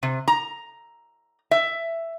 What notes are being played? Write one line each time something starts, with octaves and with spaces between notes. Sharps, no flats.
C3
A#5
E5